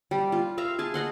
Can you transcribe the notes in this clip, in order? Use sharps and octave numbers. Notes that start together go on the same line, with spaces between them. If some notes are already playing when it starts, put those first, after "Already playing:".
G3
F4
E5 F5 A#5
G#4 G#5 A5
D#5 F#5 C6